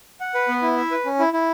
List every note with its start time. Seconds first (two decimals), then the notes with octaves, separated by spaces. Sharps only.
0.20 F#5
0.34 B4
0.48 B3
0.62 E4
0.77 E5
0.91 B4
1.05 C#4
1.19 E4
1.33 E4